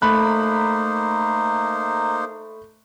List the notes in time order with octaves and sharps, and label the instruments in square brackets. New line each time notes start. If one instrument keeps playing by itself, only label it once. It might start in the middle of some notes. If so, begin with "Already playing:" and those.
[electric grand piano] A3 B5 F#6 [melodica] A#3 D#4 C5